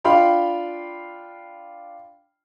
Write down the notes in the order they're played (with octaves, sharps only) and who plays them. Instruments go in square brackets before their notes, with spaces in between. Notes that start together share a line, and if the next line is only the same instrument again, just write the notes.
[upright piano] D4 F4 F5 G5 B5 C6